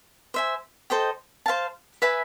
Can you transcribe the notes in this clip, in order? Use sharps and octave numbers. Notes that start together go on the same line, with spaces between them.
C5 E5 G#5
A4 C5 D#5 G5
C5 F5 A5
B4 E5 G#5 B5